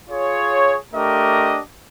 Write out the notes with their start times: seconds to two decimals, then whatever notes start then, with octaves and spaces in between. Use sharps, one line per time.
0.10 F4 G#4 C#5
0.93 A3 D4 G4 A#4 D#5